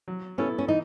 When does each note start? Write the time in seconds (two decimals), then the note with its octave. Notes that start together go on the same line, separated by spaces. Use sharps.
0.08 F#3
0.38 B3 C#4 E4 A4
0.58 C#4
0.68 E3 D#4